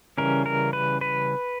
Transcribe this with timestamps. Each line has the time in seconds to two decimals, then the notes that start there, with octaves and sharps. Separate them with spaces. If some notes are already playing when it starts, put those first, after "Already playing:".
0.18 C#3 E3 G3 C#4 A#4
0.46 A#4
0.73 B4
1.01 B4